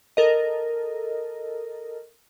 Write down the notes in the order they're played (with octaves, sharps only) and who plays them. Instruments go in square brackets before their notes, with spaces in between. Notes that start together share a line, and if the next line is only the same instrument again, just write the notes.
[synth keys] A4 A#4 D#5